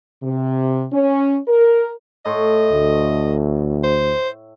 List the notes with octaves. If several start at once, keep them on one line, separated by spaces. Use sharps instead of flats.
C3
C#4
A#4
A2 D#5 C6 C#6
D2
C5